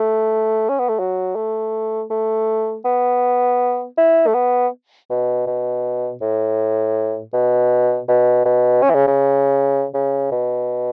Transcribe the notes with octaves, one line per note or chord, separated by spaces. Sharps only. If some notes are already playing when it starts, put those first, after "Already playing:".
Already playing: A3
C#4
B3
A3
F#3
A3
A3
B3
E4
A3
B3
B2
B2
A2
B2
B2
B2
C#4
E3
C#3
C#3
C#3
B2